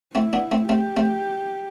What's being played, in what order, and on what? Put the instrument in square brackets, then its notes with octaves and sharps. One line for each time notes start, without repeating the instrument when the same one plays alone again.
[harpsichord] A3 C4 [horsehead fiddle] E4
[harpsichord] B3 D4
A3 C4
[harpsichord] A3 C4 [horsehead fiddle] G4
[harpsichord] A3 C4